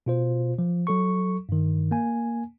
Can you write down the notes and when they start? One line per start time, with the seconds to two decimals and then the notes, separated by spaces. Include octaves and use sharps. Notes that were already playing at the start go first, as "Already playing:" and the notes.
0.06 B2 F4 C5
0.59 F3
0.87 F#3 A4 C#6
1.49 G2 D#3
1.91 A#3 G#5